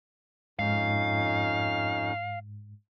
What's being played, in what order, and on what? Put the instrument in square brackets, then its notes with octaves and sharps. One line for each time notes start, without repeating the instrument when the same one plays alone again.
[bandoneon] F2 C#4 D#4 [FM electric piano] G#2 [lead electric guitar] F5